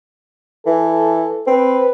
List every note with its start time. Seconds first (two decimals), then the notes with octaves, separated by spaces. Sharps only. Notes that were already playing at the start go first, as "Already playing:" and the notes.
0.66 E3 A4
1.47 C4 B4